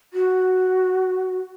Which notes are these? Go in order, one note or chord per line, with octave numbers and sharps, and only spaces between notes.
F#4